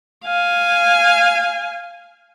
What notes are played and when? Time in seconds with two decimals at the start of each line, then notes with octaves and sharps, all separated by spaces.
0.25 F5 G#5